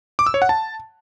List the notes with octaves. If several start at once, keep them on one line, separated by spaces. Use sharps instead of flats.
D6
E6
C#5
F#5
A5